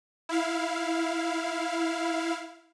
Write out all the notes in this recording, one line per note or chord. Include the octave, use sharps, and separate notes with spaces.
E4 F5